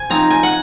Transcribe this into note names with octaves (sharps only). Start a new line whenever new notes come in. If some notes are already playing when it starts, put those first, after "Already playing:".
Already playing: C3 G#5
F3 C4 D#4 A#5
G#5
F#5